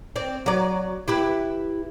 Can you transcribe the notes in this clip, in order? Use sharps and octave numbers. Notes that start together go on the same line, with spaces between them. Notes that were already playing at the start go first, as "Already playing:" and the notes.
C4 D5
F#3 D5
E4 G4 B4